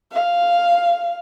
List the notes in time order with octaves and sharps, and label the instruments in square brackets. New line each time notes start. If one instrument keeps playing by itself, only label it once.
[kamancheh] F5